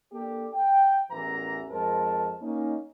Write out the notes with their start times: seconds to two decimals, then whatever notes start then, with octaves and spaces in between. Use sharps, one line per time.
0.13 A#3 D4 G4 A4
0.54 G5
1.11 A1 E2 E3 E4 A#4 A#5
1.71 F2 G#3 A#4 C5 A5
2.41 A#3 C#4 D#4